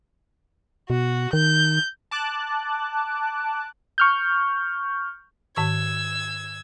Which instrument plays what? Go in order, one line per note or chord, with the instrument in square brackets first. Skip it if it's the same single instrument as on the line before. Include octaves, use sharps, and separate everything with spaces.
[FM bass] B2 [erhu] F#4
[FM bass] D#3 [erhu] G6
[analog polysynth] A5 D6 F#6
[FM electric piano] C#6 F6 G6
[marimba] G#2 D#3 C#6 [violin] E6 G#6